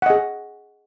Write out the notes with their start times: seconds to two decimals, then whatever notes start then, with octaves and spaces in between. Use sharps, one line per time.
0.02 F#5
0.06 D#5
0.10 G#4